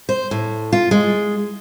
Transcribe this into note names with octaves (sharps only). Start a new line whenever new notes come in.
C5
A2
F4
G#3